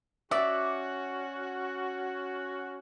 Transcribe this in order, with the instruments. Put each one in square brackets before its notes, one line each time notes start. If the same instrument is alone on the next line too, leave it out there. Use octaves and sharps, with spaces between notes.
[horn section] C#4 F#4 [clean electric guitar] D5 [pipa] E5